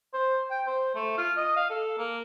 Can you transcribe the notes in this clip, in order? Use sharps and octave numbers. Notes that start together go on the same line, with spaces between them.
C5
G5
C5
A3
F4
D#5
F5
A4
A#3